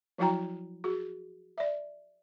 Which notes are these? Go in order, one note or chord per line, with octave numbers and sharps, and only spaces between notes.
F3 F#3 E4 F#4 G5 A#5
F#4 G#4
D5 E5